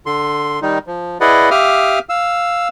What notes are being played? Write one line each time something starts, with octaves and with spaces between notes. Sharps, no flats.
D3 C6
D#3 G3 D#4
F3
E4 G#4 B4 D5 D#5 F#5
G4 E5 F5 D6 D#6 F6
F5 E6